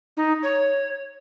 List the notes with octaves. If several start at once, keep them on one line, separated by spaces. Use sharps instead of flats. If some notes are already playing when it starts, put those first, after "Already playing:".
D#4
C#5